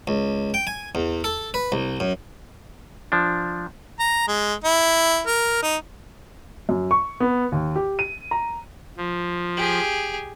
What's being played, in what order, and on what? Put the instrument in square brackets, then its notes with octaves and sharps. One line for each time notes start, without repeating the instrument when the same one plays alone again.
[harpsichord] C#2
G5
G#5
E2
A4
B4
C2
F#2
[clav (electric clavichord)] F3 D4
[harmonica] A#5
G#3
E4
A#4
D#4
[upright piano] F#2
C#6
B3
D#2
G4
D#7
A#5
[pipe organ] F3
[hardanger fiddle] G4 G#4